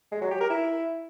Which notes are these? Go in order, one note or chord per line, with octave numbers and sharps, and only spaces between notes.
G#3
F#3
G4
A#4
E4